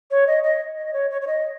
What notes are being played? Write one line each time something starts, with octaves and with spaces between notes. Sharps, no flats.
C#5
D#5
D#5
D#5
C#5
C#5
C#5
D#5